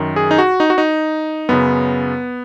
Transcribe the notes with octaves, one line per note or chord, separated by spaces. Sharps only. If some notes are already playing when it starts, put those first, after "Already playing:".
Already playing: F#2 D#3
G#4
D#4
F#4
D#4
F#4
D#4
F#2 C#3 B3